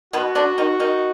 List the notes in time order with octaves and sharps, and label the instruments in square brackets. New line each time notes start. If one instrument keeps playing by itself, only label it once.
[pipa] B2 B3 [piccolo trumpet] F#4
[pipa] D3 D4
D#3 D#4
D#3 D#4